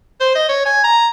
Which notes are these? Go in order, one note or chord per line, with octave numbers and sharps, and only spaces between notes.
C5
D#5
C#5
G#5
A#5